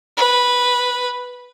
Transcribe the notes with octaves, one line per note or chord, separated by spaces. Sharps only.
B4